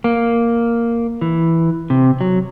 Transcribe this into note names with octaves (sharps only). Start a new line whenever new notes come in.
A#3
E3
C3
F#3